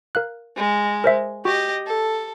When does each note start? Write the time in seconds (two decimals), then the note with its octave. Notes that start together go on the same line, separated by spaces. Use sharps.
0.15 A#4 F5 F#6
0.56 G#3
1.04 A#4 C5 E5
1.45 F#4 G4 D#5
1.86 A4